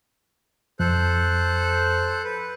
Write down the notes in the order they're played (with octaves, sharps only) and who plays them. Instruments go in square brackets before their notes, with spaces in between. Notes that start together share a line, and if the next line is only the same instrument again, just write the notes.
[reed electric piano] F2 [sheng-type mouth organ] A4 C5 F#6
[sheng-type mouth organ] B4